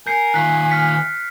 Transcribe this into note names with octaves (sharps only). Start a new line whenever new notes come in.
A#4 G#5 G6 C7 C#7
D#3 F4 F#6 B6
F6 B6 C#7